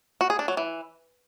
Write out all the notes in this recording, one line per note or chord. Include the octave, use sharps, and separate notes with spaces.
F#4
G#4
D4
F#3
E3